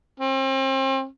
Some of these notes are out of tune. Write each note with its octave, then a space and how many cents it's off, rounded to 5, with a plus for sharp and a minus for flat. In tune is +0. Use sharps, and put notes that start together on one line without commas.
C4 +35